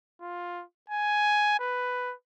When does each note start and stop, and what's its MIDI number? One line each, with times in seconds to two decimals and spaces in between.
0.21 0.64 65
0.89 1.58 80
1.60 2.13 71